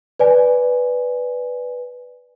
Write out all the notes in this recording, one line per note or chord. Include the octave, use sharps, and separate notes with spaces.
B4 D5 G#5